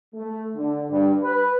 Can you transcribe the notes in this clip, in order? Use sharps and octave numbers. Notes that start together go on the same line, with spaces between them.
A3
D3
G2
B4